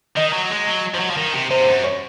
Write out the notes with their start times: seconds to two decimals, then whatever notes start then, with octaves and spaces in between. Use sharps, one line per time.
0.16 D#3 D#5
0.33 F#3
0.50 G#3
0.67 F#3
0.94 F3
1.00 F#3
1.11 F3
1.17 D#3
1.34 C3
1.51 C3 C5
1.61 G#2
1.67 F#2
1.84 C#5